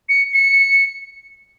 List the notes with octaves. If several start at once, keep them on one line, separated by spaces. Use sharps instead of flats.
C#7
C#7